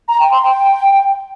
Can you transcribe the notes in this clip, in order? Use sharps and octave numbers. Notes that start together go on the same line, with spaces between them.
A#5
G5
C6
G5